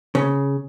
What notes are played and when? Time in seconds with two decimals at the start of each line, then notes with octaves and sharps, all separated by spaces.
0.15 C#3